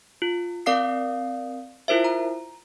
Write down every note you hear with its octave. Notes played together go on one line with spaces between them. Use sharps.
F4
C4 A#4 D5 F5 D#6 C7
E4 F4 A#4 C5 E5
A#5